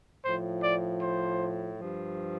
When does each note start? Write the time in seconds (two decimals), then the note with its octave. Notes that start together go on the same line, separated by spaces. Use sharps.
0.24 A2 F3 C5
0.63 D5
1.01 C5
1.78 G2 F3